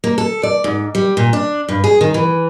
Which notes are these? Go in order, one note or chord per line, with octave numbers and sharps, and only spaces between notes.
A#3
A4
D5
G#2
G3
A#2
D4
G2
G#4
D#3
E3